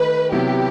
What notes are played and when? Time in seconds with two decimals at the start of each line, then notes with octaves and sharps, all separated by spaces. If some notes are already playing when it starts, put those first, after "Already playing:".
Already playing: D#3 A3 D#4 B4
0.32 C3 F#3 B3 E4 G4